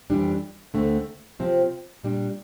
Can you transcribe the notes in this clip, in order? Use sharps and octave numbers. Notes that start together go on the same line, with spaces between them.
F2 E3 G3 D4
D2 D3 A3 C4
C3 F3 C4 G4
A#2 G3 D4